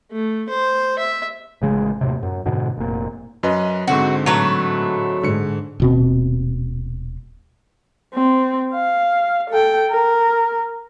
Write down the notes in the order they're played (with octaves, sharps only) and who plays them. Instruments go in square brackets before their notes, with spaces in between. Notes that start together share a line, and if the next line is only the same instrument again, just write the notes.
[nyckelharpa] A3
C5
E5
[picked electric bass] A1 C#3 G#3
D#2 A2 C3
F#2
G#2 B2 D3
F1 A#2
[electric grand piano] F#2 B4 D#5
[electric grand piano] G#2 D3 C4 [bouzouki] F#4
[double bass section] A2 [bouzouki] F#3 A3 B4
[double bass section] G#2 [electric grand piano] D3 C#7
[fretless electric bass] D#1 B2 C4
[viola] C4
F5
A4 G5
A#4